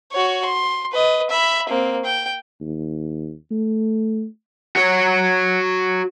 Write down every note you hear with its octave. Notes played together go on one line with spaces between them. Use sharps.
F#4 C#5
C6
B4 D#5
E5 B5
A#3 C4
G5
D#2
A3
F#4 C#5